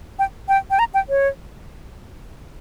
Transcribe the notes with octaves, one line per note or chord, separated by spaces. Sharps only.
G5
G5
G5
A#5
G5
C#5